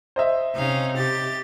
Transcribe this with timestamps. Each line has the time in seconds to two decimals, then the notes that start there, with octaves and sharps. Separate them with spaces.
0.16 C5 D#5 E5
0.56 C3 C#4 D#4 F5
0.96 G4 A6